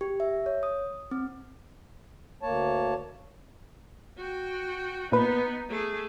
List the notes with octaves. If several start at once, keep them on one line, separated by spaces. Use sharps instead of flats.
G4
E5
C#5
D#6
C4
D2 A#3 C#5 A5
F#4 G5
A#2 B3 D#4 B4
A3 G#4